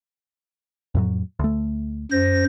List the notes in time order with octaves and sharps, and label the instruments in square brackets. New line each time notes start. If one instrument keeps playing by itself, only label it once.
[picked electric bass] F2 A2 F#3
D2 A3
[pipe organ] F#2 C5 A#6